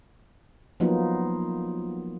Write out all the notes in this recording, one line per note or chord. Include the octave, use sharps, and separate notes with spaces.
F3 F#3 A#3 B3 D#4 F4